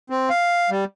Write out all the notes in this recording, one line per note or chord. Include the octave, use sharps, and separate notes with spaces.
C4
F5
G3